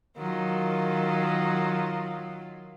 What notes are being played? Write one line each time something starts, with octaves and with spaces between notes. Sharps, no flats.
D#3 F#3 F4